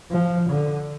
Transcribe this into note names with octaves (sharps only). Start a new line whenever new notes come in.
F3
D3